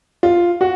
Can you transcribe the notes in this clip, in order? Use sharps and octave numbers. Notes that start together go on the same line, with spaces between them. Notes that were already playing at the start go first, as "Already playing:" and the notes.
F4
F#4